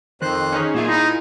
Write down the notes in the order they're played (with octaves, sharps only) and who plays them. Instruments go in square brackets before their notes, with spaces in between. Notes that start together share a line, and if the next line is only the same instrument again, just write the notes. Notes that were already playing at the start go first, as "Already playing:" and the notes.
[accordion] F2 C5 F#6 [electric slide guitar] D#3
[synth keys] C#4 D#4 G#4
[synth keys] A#2 F4 G#5 [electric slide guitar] A#3 E5 [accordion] G#4
[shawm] D#4 [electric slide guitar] E4